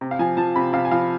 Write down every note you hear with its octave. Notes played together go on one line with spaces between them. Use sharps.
C3
F5
F3 G#5
F3 A5
C3 B5
C3 F5
G#5
F3 F5